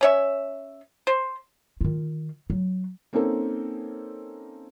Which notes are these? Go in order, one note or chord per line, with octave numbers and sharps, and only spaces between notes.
C#4 C#5 E5
C5
D#3 F4
F#3
A#3 C4 C#4 D#4 A4